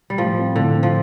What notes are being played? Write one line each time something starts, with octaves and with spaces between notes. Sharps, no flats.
G3
A2 F3
C4
A2 D3
C4
F3